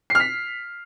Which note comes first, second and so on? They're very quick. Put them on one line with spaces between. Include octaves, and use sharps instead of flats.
C7 F6 B6